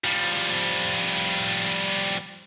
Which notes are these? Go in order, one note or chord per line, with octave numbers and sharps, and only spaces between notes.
F3 G3